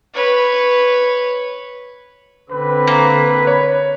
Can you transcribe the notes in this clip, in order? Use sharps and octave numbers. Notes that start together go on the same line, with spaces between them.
B4 C#5
D3 C4 B4
A#3
C#5